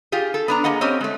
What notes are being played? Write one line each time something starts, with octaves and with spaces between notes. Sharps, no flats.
F4 G4 G#4
A4
B3 D4 A#5
A#3 G#4 D#5 F#5
C4 C#4 G4 C#5 D#5
G#3 A3